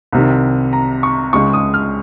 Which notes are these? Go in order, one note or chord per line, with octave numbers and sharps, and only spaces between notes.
C2 C3 D#3
A#5
C#6
C#2 C#3 G#3 C#6
D#6
F6